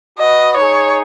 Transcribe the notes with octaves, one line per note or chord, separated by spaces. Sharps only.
F#4 B4 D#5
D#4 G#4 C#5